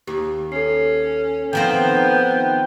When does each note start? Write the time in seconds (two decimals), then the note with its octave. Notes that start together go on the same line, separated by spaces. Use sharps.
0.07 D#2 G4
0.52 C#4 A4 C7
1.53 D#3 F3 B3 C4 G5